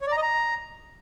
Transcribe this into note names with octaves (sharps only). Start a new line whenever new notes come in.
C#5
D5
A#5
D#5
A#5